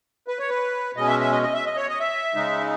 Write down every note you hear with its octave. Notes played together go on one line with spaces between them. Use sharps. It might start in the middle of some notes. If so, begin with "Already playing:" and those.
B4
C#5
B4
B2 G#3 C#4 D#5
E5
E5
D#5
D#5
E5
D#5
C#5
D#5
E5
C#3 G#3 D#4